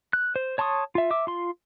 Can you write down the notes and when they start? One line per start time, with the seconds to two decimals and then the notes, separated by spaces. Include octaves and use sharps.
0.13 F#6
0.36 C5
0.58 C#5 A5 C6 C#6 D#6
0.95 F4 E5
1.11 E5 D6
1.27 F4 C6